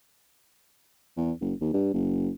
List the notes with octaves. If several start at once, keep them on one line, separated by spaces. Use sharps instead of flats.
E2
F#1
D#2
G2
F#1